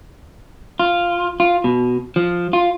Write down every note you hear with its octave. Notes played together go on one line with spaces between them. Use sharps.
F4
F4
B2
F3
F4